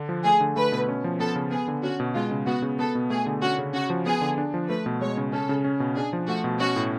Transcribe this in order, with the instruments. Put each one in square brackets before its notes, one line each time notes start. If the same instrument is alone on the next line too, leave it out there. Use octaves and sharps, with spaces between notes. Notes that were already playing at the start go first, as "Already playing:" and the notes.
Already playing: [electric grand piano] D3 D4
F3
[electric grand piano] A3 [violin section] G#4
[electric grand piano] D3
[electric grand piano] A3 [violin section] B4
[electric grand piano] B2
C#4
F3
[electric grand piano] B3 [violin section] A4
[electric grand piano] C#3
[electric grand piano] B3 [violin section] G#4
[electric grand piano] D3
[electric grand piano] C#4 [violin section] F#4
[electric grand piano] B2
[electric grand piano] G#3 [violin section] F4
[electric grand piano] C#3
[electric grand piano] B3 [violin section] F#4
[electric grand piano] C#3
[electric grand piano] B3 [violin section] A4
[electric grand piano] B2
[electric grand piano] A3 [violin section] G#4
[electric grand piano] D3
[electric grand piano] C#4 [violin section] F#4
[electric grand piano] C#3
[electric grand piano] C#4 [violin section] F#4
[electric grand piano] F3
[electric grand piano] B3 [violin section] G#4
[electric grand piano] D3
D4
F3
[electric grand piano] A3 [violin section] B4
[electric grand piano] B2
[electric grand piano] G#3 [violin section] C#5
[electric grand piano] C#3
[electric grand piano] C#4 [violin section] A4
[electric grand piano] C#3
C#4
B2
[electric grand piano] D4 [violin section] G#4
[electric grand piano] F3
[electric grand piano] A3 [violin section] F#4
[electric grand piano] B2
[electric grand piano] C#4 [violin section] F#4
[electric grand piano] A2